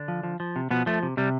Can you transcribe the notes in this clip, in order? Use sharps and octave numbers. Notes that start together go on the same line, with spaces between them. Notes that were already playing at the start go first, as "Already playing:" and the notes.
Already playing: D3 D4
F3
F3
F3
C3
B2 F3 B3
F3 A3
C3
C3 G3